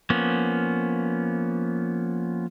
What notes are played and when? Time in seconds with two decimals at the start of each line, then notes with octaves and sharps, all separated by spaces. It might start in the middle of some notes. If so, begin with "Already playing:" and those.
0.10 F3 A#3 B3 C#4